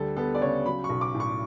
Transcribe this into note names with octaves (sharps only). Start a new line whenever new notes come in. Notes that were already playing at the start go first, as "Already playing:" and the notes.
Already playing: D2 G3 A4
B3 A4
D5
C#3 C#5
F#3 B5
C#6
B1
D6
A2
C#6